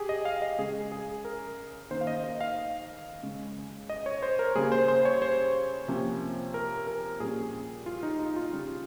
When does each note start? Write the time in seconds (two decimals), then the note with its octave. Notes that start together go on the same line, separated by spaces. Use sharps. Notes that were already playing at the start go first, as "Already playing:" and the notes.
Already playing: G4 G#4
0.09 D#5
0.25 F5
0.42 D#5
0.59 C#3 G#3 C#4 G#4
0.92 G#4
1.25 A#4
1.91 D#3 A#3 C#4 C5
2.01 F5
2.07 D#5
2.24 D#5
2.41 F5
3.23 C#3 G#3 C#4
3.89 D#5
4.06 C#5
4.23 C5
4.39 A#4
4.55 C#3 G3 A#3 G#4
4.72 C5
4.88 C5
5.05 C#5
5.22 C5
5.88 C3 F3 A#3 C#4
6.54 A#4
6.87 A#4
7.20 A#2 G3 C#4 G#4
7.86 F4
8.03 D#4
8.19 D#4
8.36 F4
8.53 C#3 G3 C#4